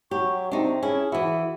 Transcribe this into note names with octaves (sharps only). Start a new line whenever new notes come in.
F#3 G4 C#6
C3 C4 D4 D#4
C#4 E4 G#4
E3 E4 F#4